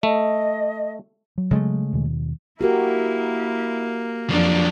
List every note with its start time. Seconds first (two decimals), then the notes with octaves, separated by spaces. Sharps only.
0.03 A3 D#5
1.38 F#3
1.51 C#3 G#3 A3
1.93 D#2 B2 D#3
2.61 A#3 E4 F#4 G4 A#4
4.30 F2 F3 F#3 D4